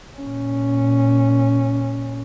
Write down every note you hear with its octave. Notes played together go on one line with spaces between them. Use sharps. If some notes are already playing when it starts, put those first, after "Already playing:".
A#2 C#4